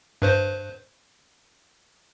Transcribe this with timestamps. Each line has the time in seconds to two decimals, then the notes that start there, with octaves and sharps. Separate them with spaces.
0.22 G2 B4 C5